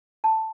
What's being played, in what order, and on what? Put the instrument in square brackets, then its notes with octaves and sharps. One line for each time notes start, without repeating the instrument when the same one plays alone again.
[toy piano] A5